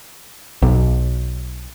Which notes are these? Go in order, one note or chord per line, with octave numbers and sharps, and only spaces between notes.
B1